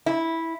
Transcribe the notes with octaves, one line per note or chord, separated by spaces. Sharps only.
E4